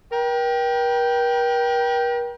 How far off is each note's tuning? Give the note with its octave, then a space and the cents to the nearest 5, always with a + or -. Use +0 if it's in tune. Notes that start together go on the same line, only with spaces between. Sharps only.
A#4 +45 G5 -5